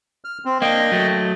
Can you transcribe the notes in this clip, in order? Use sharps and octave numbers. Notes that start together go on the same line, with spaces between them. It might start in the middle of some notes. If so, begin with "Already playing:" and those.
F6
C4
A#3 D4 D#5 G5
F#3 A3